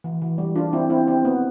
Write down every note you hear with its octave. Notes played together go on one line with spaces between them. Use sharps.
E3
E3
G3
D4 F4
C4 E4
C4 E4
C4
B3